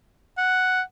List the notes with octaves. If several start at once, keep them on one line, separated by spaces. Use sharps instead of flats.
F#5